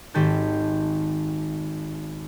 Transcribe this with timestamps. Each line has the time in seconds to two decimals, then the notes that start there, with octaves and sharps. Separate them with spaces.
0.14 G#1 D#3 G4 A4 G6